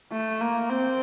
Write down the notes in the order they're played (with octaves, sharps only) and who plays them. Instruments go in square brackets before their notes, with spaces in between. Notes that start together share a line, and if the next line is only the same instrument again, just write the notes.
[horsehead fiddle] A3
A#3
C4